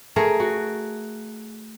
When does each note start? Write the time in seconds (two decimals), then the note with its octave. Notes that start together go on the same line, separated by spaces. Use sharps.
0.16 A3 G#4 A#4
0.40 F#4